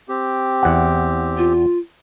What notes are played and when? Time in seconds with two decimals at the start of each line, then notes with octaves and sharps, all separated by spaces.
0.09 C4 G4
0.63 E2 F#5
1.38 F4